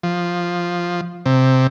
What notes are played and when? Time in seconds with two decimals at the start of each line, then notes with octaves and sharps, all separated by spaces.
0.03 F3
1.26 C3